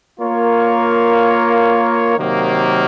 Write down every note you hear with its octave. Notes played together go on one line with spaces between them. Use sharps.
A#3 F4 A#4 C#5
C3 D#3 F#3 A#3